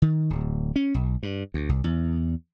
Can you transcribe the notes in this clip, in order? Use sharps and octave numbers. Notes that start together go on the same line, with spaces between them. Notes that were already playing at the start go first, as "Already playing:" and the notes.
D#3
D1
C#4
B1
G2
D2
C2
E2